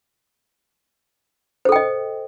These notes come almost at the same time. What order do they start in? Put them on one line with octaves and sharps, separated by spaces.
C5 A4 G5 D#5